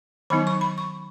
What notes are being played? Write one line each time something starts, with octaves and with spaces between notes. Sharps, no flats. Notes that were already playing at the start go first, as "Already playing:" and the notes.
D#3 F#3 B3 D#4 B5
C#6
B5
C#6